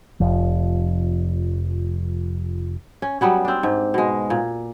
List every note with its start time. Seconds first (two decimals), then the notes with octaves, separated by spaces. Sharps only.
0.20 F1 F3
3.02 C#4
3.21 F#3 G3 B3 C#4
3.45 C4 D4
3.63 G#2
3.94 B2 G#3
4.30 A#2